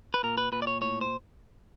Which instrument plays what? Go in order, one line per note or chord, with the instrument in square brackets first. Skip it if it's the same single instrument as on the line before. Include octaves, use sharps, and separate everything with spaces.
[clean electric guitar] B4
A#2 A#4
B4
A#2 B4
D5
C#5
A2 C#5
C5